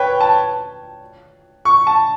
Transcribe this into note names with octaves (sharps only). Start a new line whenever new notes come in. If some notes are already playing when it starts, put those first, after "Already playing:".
Already playing: B4 C#5 G5
A5
C#6
A5